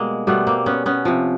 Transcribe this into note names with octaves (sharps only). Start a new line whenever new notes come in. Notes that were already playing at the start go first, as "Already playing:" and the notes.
Already playing: B2 G3 G#3 A#3
B2 G3 A3 B3
A#3 C4
B3 C#4
B3 C#4
C3 F3